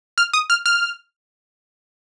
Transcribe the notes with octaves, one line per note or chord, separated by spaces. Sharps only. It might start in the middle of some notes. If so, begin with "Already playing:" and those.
F6
D#6
F6
F6